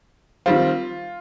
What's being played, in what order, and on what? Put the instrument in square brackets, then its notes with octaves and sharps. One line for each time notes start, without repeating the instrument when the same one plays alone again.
[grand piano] D#3 G3 C4 F4